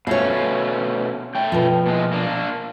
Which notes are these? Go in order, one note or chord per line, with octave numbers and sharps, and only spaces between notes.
B2 A3 C#4 C#5 F5
A3 G5
B2 F3
A#2 G#3
A#3 D4